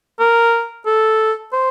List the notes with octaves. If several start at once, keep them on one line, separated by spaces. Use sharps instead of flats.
A#4
A4
C5